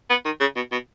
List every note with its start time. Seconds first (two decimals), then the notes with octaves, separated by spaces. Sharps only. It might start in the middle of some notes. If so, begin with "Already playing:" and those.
0.10 B3
0.25 D#3
0.40 C#3
0.56 B2
0.72 B2